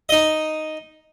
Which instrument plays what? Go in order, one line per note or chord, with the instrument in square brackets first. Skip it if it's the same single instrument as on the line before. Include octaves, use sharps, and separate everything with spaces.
[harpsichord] D#4 D#5